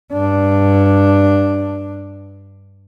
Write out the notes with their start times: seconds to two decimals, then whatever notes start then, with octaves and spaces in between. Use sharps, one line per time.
0.13 G2 D4